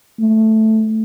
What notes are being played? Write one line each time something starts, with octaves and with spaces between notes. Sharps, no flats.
A3